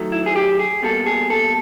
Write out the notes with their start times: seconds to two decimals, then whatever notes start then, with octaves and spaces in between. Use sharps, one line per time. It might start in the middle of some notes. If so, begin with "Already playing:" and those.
Already playing: D#3 F#3 A3
0.12 E4
0.26 G#4
0.36 G4
0.59 G#4
0.82 B2 G3 A#3 A4
1.06 G#4
1.30 A4